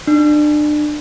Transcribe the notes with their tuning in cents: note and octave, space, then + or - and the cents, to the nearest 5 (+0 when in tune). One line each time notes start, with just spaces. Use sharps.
D4 +30